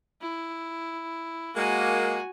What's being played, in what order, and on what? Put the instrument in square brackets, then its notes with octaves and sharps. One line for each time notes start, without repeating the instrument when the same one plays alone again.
[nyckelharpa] E4
[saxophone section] G#3 A#3 [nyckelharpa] F#4 G#5